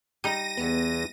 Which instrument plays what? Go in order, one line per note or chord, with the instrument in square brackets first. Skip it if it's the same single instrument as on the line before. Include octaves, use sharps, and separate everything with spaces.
[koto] G3 D#4 [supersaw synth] A#6 D#7
[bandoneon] E2 [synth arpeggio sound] B3